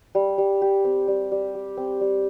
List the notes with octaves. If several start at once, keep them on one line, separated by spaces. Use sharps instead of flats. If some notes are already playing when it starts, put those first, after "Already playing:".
G3
G3
G4
C4
G3
G3
G4
C4
G3